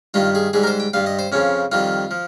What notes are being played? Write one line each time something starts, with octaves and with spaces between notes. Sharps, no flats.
G2 D#3 G3 F4
G#4
G#2 G3 G#4
A#4
C5
G5
G2 G3 F5
D#5
C5
F2 C#3 F3 C#4
F2 D#3 G3 F4
F3